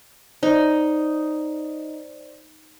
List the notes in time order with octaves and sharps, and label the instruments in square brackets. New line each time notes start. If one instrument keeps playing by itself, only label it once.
[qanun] D#4 [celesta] C5 D5